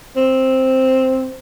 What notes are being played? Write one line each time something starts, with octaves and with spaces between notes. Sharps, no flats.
C4